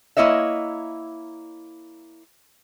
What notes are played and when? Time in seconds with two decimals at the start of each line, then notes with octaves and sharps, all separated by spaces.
0.17 A#3 E4 C#5 D#5 E5